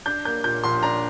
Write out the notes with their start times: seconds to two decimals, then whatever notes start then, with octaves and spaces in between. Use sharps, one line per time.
0.06 D4 G6
0.25 A#3 G6
0.44 A#2 G6
0.64 A#1 C6
0.83 D4 A#5